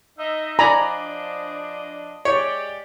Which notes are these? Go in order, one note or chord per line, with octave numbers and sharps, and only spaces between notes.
D#4 D#5 E5
F3 D4 D5 D#5 G#5 A#5 B5
G#3 G4 C#5 D5